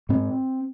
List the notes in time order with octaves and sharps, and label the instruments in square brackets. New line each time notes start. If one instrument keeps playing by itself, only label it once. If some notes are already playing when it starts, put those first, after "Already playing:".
[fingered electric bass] G#2 C4